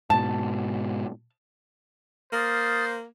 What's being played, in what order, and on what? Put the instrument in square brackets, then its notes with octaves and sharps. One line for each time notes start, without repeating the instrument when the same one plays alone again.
[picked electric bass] G#2 B2 [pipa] A5
[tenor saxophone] A#3 [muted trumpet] C5 [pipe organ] D#6 F6 A6